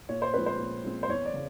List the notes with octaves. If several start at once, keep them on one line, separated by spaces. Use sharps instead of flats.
A#2 C#5
C5
F3 G#3 C4 B4
C5
A#2
F3 G#3 C4
C5
E2 C#5
D5
C#3